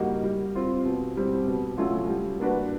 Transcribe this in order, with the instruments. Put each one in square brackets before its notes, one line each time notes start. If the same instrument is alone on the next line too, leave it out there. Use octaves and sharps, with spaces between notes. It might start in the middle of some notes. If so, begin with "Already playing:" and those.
Already playing: [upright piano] G3 A#3 D#4 F#4
G3
C4 F4
B2
G3 C4
B2
F#3 A3 C#4 F4
G3
A#3 D4 F#4 B4